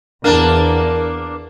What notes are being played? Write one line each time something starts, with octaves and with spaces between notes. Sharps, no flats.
E2 A#3 D4 A#4 A5